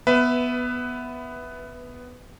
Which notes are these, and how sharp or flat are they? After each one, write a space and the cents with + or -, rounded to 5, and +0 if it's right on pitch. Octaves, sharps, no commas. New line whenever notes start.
B3 +0 B4 +15 E5 +0